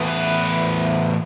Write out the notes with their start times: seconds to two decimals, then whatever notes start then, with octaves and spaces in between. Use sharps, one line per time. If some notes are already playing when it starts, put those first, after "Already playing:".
Already playing: A2 E3 B3
0.08 B4